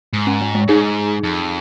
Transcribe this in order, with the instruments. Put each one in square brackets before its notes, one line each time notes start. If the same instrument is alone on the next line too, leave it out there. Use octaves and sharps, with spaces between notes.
[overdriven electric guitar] G#2
[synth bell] C#4
G#3
G#3
[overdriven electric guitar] G#2 [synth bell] D#4 G#4
[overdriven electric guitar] F2